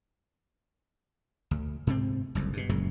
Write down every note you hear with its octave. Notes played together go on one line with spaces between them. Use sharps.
D2
G#2 C3 C4
F#1 C2 F2
G2 B2
F#1 F#2 A#2 G#3